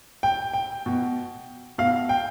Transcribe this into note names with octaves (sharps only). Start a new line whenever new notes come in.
G5
G5
B2
B2 F5
G5